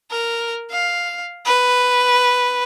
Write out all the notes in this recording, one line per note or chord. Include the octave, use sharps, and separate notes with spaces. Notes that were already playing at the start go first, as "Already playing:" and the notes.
A#4
F5
B4